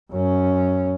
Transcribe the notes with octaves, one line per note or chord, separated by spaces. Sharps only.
F#2 C#4